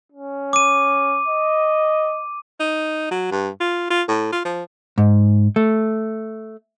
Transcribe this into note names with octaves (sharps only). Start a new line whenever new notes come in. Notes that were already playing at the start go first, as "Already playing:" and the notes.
C#4
D6 D#7
D#5
D#4
F#3
G2
F4
F4
A2
F4
F3
G#2
A3